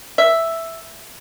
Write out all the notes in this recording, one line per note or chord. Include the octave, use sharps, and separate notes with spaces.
E5